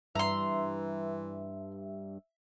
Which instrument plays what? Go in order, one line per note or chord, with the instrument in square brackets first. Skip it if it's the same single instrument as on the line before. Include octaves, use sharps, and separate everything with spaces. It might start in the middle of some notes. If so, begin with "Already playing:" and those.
[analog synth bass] G2 [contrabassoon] E3 [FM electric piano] E5 [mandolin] A#5 C6